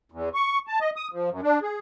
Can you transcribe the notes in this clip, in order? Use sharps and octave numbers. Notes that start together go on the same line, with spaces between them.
E2
C#6
A5
D#5
D#6
F3
F#2
D4
G#4